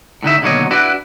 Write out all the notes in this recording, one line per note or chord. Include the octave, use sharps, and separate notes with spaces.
A2 D3 D#4 E5
D#2 B2 D3 F#3 C#5 D#5
D4 E4 F#4 B4